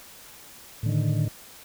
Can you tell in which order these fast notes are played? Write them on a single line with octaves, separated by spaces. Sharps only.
A2 D3 D#3